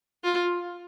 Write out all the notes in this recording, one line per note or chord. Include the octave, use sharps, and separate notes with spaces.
F4